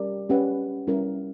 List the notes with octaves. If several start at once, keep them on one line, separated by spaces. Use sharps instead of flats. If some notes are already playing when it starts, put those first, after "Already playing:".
Already playing: G3 C#4 G4 A#4 D5
C#4 G4 B4 F#5
G3 C#4 E4 A#4